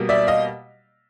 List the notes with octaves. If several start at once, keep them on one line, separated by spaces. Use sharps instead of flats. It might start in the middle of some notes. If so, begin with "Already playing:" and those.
Already playing: B2 G3 A#3
D5 E5
D#5 F5